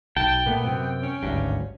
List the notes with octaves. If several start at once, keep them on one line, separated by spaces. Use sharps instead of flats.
B1 G5 A5
A#2 A3 B3
F#2 C3
C#4
G#1 D2 G2